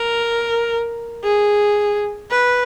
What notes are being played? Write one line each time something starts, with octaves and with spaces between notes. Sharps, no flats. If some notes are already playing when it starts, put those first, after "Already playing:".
Already playing: A#4
G#4
B4